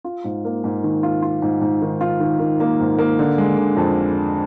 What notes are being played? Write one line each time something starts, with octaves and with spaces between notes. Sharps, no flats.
F4
G#2
A#3
G#2
D#3
F4
F4
G#2
G#2
D#3
F4
D#3
D#3
A#3
G#2
A#3
D3
G#3
D3
F2